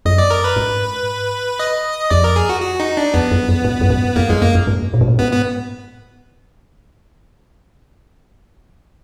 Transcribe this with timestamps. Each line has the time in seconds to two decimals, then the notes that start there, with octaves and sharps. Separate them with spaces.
0.06 F#2 D#5
0.18 D5
0.31 A#4
0.44 B4
0.56 G#2
1.60 D#5
2.10 F2 D5
2.24 A#4
2.36 G#4
2.49 F#4
2.62 F#4
2.80 D#4
2.97 D4
3.14 F2 B3
3.31 F#2
3.49 F#2
3.64 G#2
3.81 F#2
3.90 G#2
4.16 F#2 A#3
4.30 F#2 G#3
4.42 F#2 A#3
4.55 F#2
4.67 G#2
4.94 A#2
5.01 G#2
5.08 A#2
5.19 G#2 B3
5.33 B3